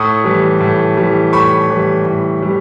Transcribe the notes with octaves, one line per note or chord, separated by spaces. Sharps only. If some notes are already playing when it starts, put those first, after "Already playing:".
Already playing: A2 C#6 D#6
E3 G3
A2
E3 G3
A2 B5 C#6
E3 G3
A2
E3 G3